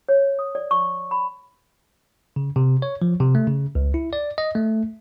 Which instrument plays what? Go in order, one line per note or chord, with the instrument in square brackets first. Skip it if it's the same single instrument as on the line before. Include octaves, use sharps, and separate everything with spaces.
[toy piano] C#5
D#6
D5
C#6
B5
[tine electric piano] C#3
C3
C#5
F3
C3
A3
C#3
C#2
E4
D5
D#5
A3